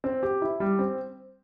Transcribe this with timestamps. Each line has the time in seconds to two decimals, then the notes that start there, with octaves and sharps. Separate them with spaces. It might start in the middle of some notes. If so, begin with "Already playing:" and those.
0.04 C4
0.23 G4
0.42 E4
0.60 G3
0.79 C4